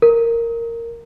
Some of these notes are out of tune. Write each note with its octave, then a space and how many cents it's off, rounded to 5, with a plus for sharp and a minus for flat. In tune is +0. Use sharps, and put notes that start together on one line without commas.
A#4 -10